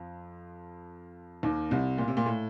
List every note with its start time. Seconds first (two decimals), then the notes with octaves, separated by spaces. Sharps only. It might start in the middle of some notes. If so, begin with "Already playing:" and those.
Already playing: F2 F3
1.43 D#2 D#3
1.71 C2 C3
1.98 A#2
2.08 C3
2.17 A#2
2.26 A2